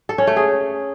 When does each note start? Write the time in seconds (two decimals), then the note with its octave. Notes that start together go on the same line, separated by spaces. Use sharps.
0.09 A4
0.18 C#4
0.27 A3
0.36 G#4